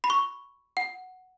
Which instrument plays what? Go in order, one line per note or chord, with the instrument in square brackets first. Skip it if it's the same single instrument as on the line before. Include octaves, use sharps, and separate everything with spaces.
[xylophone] B5
C#6
F#5